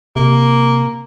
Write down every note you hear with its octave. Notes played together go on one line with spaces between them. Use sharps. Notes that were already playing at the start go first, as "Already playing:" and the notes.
C3 A#3